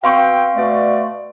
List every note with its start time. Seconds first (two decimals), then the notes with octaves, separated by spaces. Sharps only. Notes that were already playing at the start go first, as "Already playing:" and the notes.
0.04 B2 C4 F5 G5 C6 C#6
0.56 B2 A3 D5